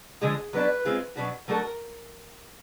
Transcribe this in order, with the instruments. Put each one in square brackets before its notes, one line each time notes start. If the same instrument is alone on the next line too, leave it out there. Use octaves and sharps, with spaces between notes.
[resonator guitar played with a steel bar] D3 F3 G#3 [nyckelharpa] G#4
[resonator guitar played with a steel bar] F#3 B3 D4 [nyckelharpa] B4
[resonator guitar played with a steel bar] G#3 C4 F4 G#4
B2 F#3 B3 D4 F#4
[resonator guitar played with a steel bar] F#3 A3 D4 F#4 A4 [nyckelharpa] A#4